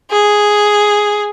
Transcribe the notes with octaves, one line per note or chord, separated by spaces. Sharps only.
G#4